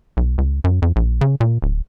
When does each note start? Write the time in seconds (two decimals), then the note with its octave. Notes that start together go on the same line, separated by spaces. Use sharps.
0.17 B1
0.38 C#2
0.64 F#2
0.82 F2
0.96 A#1
1.21 C#3
1.40 A#2
1.62 D1